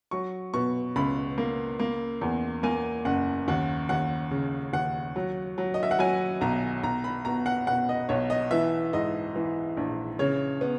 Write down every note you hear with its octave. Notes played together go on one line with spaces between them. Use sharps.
F#3 C#6
B2 C#6
C#2 B5
A#3
A#3
E2
A#3 G#5
F#1 F#5
D#2 F#5
D#2 F#5
C#3
D#2 F#5
F#3
F#3
D#5
E5
F#5
F#3 G#5
B1 A#5
B1 A#5
B5
B2 A#5
F#5
B2 F#5
D#5
B1 C#5
D#5
E3 E5
G#2 D#5
E3
A#1
C#3 C#5
B3